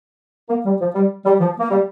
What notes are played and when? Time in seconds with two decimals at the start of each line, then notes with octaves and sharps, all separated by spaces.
0.49 A#3
0.65 G3
0.80 F3
0.95 G3
1.25 G3
1.41 F3
1.59 A#3
1.71 G3